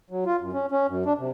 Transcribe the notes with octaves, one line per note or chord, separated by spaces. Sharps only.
F#3
F4
F#2
C#4
C#4
F#2
D4
C3